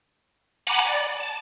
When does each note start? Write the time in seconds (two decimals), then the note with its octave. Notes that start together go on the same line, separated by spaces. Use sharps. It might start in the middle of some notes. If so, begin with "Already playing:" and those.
0.67 F#5 G#5 A#5 B5 D6
0.85 D5
1.20 A5